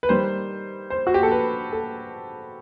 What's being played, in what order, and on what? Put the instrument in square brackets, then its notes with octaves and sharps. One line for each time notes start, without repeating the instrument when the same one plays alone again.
[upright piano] B4
D#3 G3 C5
C5
F#4
G4
A4
B4
A4